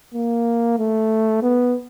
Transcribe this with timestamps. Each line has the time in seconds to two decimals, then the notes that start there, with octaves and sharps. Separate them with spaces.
0.14 A#3
0.79 A3
1.42 B3